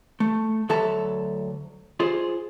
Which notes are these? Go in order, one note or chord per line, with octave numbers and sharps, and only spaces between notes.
A3
D2 F#3 A4 E5 A5 A#5
F4 G#4 C5